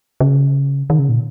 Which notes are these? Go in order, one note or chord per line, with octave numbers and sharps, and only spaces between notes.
C#3
D#3
C#3
A#2